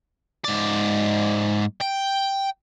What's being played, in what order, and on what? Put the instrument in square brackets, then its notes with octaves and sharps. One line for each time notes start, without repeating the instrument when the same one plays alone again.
[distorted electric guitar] G#2 D5
G5